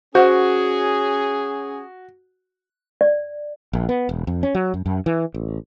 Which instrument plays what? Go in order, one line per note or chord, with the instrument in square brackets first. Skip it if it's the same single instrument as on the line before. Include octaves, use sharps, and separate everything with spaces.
[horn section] C#4 G#4 [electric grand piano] F#4 [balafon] C5 F#5
[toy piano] D5
[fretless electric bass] A#1
B3
E1
F2
C#4
F#3
F#2
F#2
E3
A1